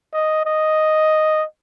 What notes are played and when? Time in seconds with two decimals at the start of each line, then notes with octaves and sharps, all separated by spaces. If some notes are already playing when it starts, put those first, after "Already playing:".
0.13 D#5
0.45 D#5